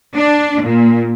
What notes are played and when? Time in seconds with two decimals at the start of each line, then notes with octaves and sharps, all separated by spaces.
0.15 D4
0.63 A#2